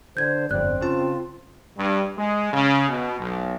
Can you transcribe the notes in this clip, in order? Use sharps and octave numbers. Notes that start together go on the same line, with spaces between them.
D3 C5 G6 G#6
G1 F2 C4 D5 F#6
C#3 F4 A5
G2
G#3
C#3
B2
B1